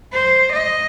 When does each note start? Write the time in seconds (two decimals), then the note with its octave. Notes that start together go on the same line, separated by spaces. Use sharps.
0.13 C5
0.52 D#5